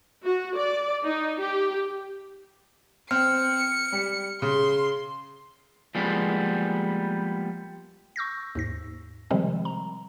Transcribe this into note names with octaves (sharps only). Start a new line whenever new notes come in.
F#4
D5
D#4
G4
C4 F6 C#7
G3
C#3 C6
F3 G3 G#3 A#3 B3
C#6 E6 G6 A#6
D#2 G#2 A#6
C3 D#3 F3 G3 G#3 C4
A#5